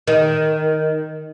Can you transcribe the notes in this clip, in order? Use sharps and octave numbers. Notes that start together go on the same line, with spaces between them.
D#3